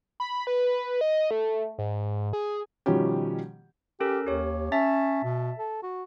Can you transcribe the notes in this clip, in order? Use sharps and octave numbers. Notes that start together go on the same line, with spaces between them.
B5
B4
D#5
A3
G#2
G#4
B2 D#3 F3 G3 C#4 G4
C#4 G4 A4 A#4
D#2 G4 C#5
C#4 E5 A5 A6
B2
A4
F#4